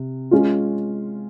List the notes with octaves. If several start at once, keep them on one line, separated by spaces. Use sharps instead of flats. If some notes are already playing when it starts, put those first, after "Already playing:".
Already playing: C3
G#3 C#4 F4